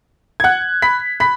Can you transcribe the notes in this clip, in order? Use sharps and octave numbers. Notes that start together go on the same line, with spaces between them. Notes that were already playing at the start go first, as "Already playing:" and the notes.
G#6
F#5 F#6
B5 B6
B5 B6